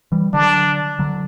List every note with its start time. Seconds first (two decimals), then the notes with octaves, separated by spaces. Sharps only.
0.12 E3 G3
0.33 D3 F#3 D4
0.99 D3 F#3